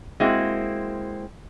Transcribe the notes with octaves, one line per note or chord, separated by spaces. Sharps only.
G#3 A#3 C4 E4 F#4